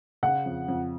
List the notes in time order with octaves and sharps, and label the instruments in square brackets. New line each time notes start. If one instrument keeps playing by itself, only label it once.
[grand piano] C#3 [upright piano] F#5
[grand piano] F2
F2